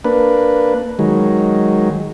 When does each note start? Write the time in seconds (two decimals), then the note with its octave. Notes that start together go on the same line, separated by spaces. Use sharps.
0.04 A#3 D4 B4
0.99 D#3 F#3 G#3